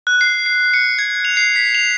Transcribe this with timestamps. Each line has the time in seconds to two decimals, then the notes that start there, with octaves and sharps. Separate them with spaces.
0.07 F#6
0.21 C7
0.46 C7
0.74 C#7
0.99 G#6
1.25 F7
1.37 C7
1.56 B6
1.75 F7